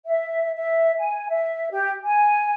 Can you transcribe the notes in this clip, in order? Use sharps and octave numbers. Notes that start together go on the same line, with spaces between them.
E5
E5
G#5
E5
G4
G#5